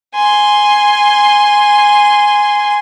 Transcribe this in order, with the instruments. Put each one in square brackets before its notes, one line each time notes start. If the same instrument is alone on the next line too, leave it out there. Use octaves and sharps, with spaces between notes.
[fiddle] G#5 C6